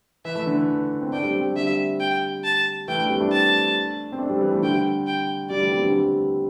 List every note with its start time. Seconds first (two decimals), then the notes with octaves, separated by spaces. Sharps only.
0.25 E3 E5
0.35 E3 A3
0.47 D3
0.57 E3
1.02 C4
1.12 A3 D4 G5
1.23 G3 C4
1.34 G3 C4
1.56 D3 G3 E5
2.00 G5
2.44 A5
2.88 E3 A3 G5
2.99 A3 D4
3.09 G3 C4
3.21 A3 D4
3.32 A5
4.12 C4
4.19 A3 D4
4.30 G3 C4
4.41 E3 A3
4.52 E3 A3
4.62 D3 G3 G5
5.07 G5
5.50 D3 G3 D5
5.61 E3 A3
5.72 G3 C4
5.83 D3 G3
5.94 G3 C4